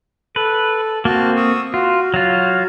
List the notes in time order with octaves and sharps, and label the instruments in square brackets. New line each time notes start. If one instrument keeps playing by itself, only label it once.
[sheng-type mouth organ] A4 [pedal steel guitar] B4
[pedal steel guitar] A#3 C4 [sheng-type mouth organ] F#4 A5 F6
[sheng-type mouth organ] C#6 D#6 E6
[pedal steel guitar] F4 [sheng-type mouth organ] F#4
[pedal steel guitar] F#3 F4